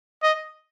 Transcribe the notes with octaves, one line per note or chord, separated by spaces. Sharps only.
D#5